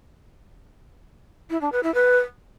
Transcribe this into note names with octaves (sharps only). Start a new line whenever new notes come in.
E4
D4
B4
E4
B4